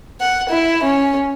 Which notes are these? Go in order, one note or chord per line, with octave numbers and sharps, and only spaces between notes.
F#5
E4
C#4